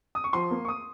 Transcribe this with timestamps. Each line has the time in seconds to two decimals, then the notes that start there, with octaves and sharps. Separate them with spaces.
0.15 D#6
0.24 C#6
0.33 F3 C6
0.51 A#3
0.65 C#6
0.68 D#6